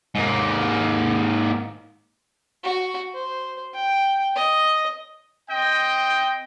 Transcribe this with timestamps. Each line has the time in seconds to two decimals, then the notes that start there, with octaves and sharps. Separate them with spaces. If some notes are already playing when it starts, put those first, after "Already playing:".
0.15 G#2 A#3
2.64 F#4
3.14 C5
3.74 G5
4.35 D#5
5.50 C4 D#5 G5